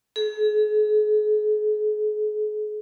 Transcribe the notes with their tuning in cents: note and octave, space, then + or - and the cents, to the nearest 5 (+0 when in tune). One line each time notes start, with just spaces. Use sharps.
G#4 +40